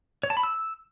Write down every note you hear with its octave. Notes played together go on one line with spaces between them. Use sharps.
C#5
A5
B5
E6